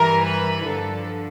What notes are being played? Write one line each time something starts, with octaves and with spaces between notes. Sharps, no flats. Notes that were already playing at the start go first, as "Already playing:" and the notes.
Already playing: G2 E3 G3 A#4
B4
G2 D3 F3 A4